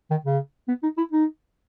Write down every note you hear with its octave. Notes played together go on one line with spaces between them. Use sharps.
D#3
C#3
B3
D#4
E4
D#4